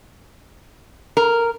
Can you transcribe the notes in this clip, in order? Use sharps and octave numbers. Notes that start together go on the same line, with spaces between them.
A#4